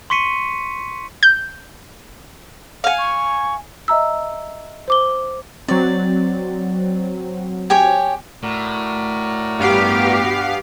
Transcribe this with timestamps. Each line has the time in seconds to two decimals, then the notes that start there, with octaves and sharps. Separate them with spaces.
0.10 C6 C#6 B6 C#7 D#7
1.23 G6
2.84 F5 F#5 G#5
2.98 C#6
3.88 D#5 E5 A#5 E6
4.88 C5 D6 G7
5.68 F#3 C4 D5
7.70 G4 C#5 G#5
8.43 A2 F#4 A#4 D5
9.59 G2 B3 G4 F5